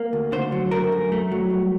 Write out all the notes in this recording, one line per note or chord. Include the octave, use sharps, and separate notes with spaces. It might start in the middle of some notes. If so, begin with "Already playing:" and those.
Already playing: A#3
D2
D3 C5
F#3
A3 A#4
F#2
A3
F#3
G2